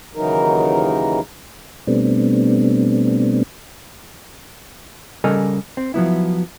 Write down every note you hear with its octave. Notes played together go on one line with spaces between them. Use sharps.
D#2 C#3 E3 F#3 D#4 A#4
B2 G3 A3 B3 C4 D4
C#3 G3 A4 A#4 D#5 G#5
C4
F3 F#3 B3 E4